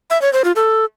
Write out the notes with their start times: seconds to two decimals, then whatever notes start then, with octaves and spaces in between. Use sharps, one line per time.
0.10 E5
0.22 C#5
0.33 C5
0.44 F4
0.56 A4